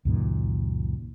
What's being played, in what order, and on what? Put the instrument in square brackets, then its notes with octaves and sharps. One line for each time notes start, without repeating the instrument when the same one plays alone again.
[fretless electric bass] C#2 F#2 A#2 D#3